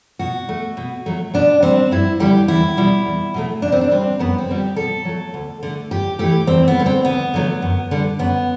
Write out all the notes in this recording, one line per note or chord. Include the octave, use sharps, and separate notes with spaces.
B2 F#4
A3
B2
F#3 A3
B2 D4
G3 C4
G2 E4
D3 G3 G4
E2 E4
B2 G3
E2
B2 F#3 A3
B2 D4
C4
D4
G3 C4
F#2 B3
C4
D3 G3
G4
B2 A4
F#3 A3
D2
D3 A3
G2 G4
E3 A3 G4
E2 C4
B3
D3 G3
C4
D2 B3
D3 F#3 A3
F#2
D3 G3
F#2 B3